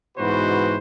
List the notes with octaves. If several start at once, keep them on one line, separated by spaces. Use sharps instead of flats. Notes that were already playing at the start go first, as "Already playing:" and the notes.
G#2 B2 E3 F#4 B4 C5